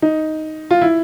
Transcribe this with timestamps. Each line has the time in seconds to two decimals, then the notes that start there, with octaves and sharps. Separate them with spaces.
0.02 D#4
0.71 F4
0.81 E4